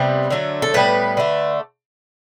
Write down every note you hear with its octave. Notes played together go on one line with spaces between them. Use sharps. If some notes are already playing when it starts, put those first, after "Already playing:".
Already playing: C3 G3 B3
D3 F#3 A3
A4
A2 G3 B3 B4
D3 A3